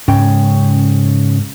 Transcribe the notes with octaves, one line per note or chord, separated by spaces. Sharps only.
G#2 C#3 G#3 C#4 G5